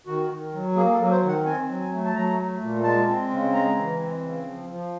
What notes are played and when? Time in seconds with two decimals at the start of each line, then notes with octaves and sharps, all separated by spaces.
0.07 D#3 F#4
0.30 D#3
0.53 F#3
0.76 A#3 G#4
0.93 A4
0.99 F#3
1.11 C5
1.22 D#3
1.28 F#5
1.45 C4 G#5
1.68 F#3
1.80 G#5
1.92 A3
2.05 A5
2.15 F#3 A#5
2.38 A3
2.61 A#2
2.84 G#3 A5
3.07 C4
3.31 C#3
3.53 G#3 A#5
3.77 E3
4.00 C4
4.23 C#3
4.46 F3
4.69 F3